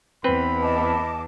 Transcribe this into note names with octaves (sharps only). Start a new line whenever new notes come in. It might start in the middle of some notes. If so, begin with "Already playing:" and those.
E2 C4 B4 B5
D#5 A5 D6